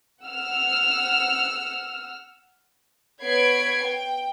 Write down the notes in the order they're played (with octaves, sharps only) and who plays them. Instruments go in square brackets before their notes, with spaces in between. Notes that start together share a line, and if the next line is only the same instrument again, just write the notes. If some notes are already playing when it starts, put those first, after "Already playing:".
[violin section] F#5 E6 F6
B3 C#5 B5 G#6 C7 D7
G5